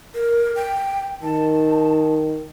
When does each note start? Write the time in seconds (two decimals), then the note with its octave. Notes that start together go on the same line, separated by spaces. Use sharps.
0.14 A#4
0.55 G5
1.23 D#3 A5